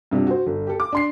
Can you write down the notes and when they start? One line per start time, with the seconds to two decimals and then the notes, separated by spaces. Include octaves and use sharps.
0.11 G2 C3 D4 F4
0.27 F#4 C5
0.46 G1
0.67 G4 A4
0.80 D6
0.93 D4 C6 C7